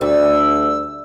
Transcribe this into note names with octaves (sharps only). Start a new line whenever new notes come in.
D2 G3 E6